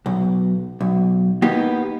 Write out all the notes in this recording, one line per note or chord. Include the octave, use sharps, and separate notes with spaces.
B1
B1
A#3 B3 D#4 G4